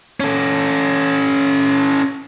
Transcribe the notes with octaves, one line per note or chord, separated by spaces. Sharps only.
C#4 A4